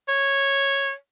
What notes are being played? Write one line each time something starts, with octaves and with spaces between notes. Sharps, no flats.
C#5